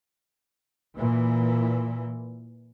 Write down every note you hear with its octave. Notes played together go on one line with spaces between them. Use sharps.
A#2 E3